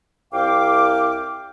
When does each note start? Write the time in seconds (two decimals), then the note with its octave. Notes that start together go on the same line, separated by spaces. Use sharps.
0.33 C2 F5 G5 D6